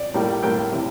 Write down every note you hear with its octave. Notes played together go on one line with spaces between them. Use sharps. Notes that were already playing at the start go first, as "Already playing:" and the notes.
Already playing: D5
A2 G3 A#3
A2 G3 A#3 G5
C3 E3